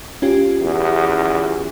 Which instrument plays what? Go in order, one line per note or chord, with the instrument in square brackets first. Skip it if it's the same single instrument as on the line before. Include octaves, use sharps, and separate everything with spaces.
[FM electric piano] C#4 F4 G4
[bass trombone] E2